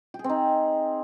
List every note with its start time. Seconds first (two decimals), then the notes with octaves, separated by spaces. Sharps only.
0.14 G4
0.19 G#4
0.24 C4
0.29 D#4